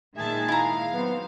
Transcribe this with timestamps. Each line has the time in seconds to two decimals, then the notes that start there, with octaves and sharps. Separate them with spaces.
0.17 A#2 D#3 G#3 G#4 E5 G#5 A5
0.48 E4 F5 A#5
0.93 F#3 B3 C4